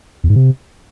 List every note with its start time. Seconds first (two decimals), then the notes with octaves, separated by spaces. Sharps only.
0.24 E2
0.30 G#2
0.36 C3